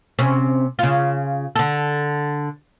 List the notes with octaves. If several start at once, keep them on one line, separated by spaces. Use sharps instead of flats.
C3 C#4
C#3 F4
D3 A4